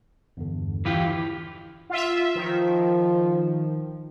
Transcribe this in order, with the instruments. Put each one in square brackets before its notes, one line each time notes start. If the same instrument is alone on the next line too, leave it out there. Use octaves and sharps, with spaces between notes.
[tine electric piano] E2 G2 D3
[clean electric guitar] E3 F4 G4
[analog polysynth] F4 E5
[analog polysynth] D#3 [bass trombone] F3